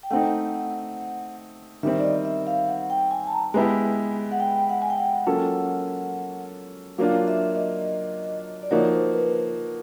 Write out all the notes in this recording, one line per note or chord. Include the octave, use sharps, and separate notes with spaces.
G5
A3 C4 D#4 F#5
D#3 G3 C4 E5
D5
D#5
E5
F5
F#5
G5
G#5
A5
A#5
G#3 B3 E4 G4 G#5
F#5
G5
F#5
G#5
G5
F#5
F#3 A#3 C#4 F4 A4
F#3 A#3 D4 F4 F5
E5
D#5
D5
F3 A#3 D#4 F#4 C#5
C5
B4